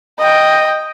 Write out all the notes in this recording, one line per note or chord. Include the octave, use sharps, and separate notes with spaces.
D#5 G5